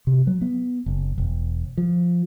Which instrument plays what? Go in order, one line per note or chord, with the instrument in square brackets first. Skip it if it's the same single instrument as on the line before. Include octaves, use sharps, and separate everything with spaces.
[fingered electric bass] C3
F#3
B3
F#1
E1
F3